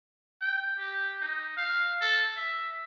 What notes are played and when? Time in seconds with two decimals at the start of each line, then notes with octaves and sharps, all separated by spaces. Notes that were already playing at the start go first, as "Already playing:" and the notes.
0.41 G5
0.78 G4
1.21 D#4
1.57 F5
2.01 A4
2.37 E5